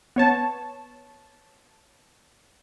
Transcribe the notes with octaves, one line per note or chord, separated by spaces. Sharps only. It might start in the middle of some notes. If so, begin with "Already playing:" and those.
B3 C#5 A5